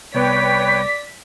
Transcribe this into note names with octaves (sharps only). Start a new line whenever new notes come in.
C2 B3 B4 C#5 D5 G5 B6